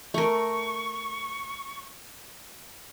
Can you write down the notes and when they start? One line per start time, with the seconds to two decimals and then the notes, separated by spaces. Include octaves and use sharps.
0.14 A3 A#4 C#6